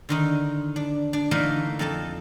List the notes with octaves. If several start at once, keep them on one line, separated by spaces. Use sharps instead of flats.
D3 D#3 D#4
D4
D4
D3 E3 A3 A#3 D#4 A#4
F2 D#4 A4 A5